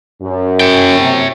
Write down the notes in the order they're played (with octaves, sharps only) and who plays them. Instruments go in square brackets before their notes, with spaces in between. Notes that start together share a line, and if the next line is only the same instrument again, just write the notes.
[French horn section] F#2
[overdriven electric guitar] C#5 G5
[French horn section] C3